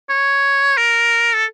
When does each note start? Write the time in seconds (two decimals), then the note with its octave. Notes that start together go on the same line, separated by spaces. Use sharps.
0.09 C#5
0.77 A#4
1.34 A4